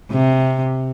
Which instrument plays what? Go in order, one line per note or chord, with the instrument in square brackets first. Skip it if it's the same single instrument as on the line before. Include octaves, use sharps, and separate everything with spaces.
[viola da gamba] C3